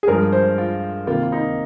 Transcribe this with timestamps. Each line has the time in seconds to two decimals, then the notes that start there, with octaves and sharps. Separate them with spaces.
0.03 G#4
0.07 G2 F3 G#3 A#4
0.32 C5
0.58 F4
1.07 C3 D#3 A#3 F4
1.23 F4
1.32 D#4